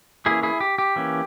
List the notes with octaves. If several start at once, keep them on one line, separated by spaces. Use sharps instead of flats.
E3 A#3 C#4 E4 G#4
E4 G#4
G4
G4
E3 A#3 C#4